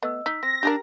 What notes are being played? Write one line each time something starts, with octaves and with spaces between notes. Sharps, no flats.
A3 B3 D#5 E6
D#4 E6 B6
C4 A#6
D4 G4 G#4 A#4